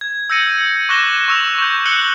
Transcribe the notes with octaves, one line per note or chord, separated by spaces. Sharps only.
G#6
E6 G6 A#6 C#7 D#7
C#6 D6 F#6 A#6 E7 G7
C#6 E6 F7
C#6 G6
E6 F#6 C#7 F#7 G7